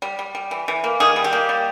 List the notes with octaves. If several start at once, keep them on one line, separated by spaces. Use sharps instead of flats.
G3
G3
G3
E3
E3
A#3
D#3 G#4
G3
G4
A#3
G3